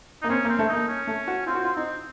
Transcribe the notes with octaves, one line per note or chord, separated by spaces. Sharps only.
A#3 D#4
C4 C#4
A#3
C4
A3
A#3 D#4
C#4
A3
F#4
C4 F4
F#4
F4
C4 D#4